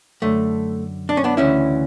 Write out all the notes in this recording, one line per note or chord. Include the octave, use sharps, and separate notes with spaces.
F#2 D3 A3
D4
C#4
B3 D4
D2 C#3 E3 C#4 E4